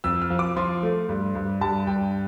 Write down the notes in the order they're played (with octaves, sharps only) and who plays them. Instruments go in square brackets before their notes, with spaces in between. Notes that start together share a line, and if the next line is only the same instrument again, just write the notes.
[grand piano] F2 E6
F6
F3
D6
F3 C6
A3
G2
G2
G2 A5
G2 G5